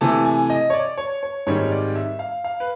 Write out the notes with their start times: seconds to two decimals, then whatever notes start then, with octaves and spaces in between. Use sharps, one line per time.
0.01 C3 E3 A3 A5
0.25 G#5
0.50 D#5
0.70 C#5
0.74 D5
0.98 C#5
1.23 C#5
1.47 G#2 D#3 G3 C4 C#5
1.71 D5
1.95 E5
2.19 F5
2.44 F5
2.60 B4